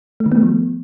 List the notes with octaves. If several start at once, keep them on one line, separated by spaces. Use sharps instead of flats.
A3
D#3
B3
A3
F3